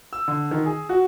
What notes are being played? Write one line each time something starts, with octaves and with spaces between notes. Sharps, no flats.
E6
D3
D#3
G#4
F#4